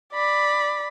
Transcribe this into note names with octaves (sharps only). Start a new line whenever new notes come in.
D5 B5